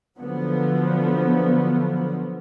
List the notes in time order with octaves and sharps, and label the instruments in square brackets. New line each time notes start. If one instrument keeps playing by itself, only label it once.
[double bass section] D3 F3 F#3 B3